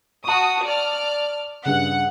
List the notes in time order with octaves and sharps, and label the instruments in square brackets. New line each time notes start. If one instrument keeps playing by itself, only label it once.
[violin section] F#4 D#6 [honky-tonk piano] A5 C#6
[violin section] D5 F6
[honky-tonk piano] G2 C#3 [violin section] F#5